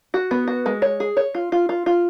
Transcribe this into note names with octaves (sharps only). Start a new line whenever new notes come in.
F#4
B3
F#4
G#3
C#5
G#4
C#5
F4
F4
F4
F4